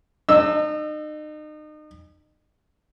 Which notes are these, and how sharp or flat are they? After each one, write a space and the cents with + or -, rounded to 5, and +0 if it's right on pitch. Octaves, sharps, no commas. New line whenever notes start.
D#4 -35 E6 +0